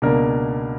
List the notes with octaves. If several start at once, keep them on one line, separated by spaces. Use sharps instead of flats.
C#2 B2 A#3 D4 A#4